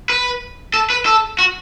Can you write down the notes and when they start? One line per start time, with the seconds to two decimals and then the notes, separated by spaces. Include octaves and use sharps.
0.10 B4
0.74 A4
0.90 B4
1.06 A4
1.39 F#4